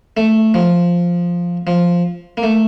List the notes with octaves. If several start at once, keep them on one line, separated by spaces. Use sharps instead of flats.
A3
F3
F3
A#3
A3